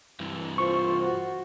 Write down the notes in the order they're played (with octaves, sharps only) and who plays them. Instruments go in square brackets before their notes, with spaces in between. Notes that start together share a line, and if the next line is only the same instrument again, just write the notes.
[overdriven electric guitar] G2 E3
[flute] F4 [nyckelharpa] C5 [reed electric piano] C#6
[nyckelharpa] F#4